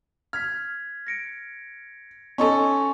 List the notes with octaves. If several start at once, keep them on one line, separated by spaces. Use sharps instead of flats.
F6 G#6 B6
A#6 C#7 D7
C#4 D#4 A4 G#5 C6 C#6